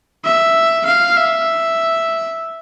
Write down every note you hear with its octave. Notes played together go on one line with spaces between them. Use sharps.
E5
F5
E5